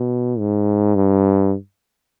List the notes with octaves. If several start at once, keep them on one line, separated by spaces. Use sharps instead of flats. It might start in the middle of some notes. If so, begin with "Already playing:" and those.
Already playing: B2
G#2
G2